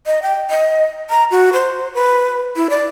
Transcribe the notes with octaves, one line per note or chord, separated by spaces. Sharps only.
D#5
G5
D#5
A#5
F#4
C5
B4
E4
D5